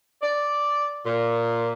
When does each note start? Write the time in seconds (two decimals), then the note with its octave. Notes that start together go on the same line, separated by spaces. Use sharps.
0.22 D5
1.06 A#2